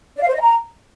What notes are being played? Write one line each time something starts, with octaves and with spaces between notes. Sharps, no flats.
D5
F5
C5
D#5
A#5